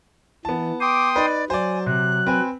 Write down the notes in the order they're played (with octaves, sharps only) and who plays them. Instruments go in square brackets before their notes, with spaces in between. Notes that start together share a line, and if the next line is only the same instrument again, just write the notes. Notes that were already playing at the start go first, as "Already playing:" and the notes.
[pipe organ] E3 [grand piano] B3 A5
[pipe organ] G5 C6 D#6 [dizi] D6
[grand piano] D#4 B4 [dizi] D5
[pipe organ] F#3 [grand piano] C5 D5 [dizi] G#5
[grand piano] C3 [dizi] F#6
[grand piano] C4 B4 G#5